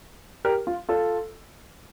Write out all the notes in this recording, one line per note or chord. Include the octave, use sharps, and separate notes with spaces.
G4 A#4
F4
F4 A4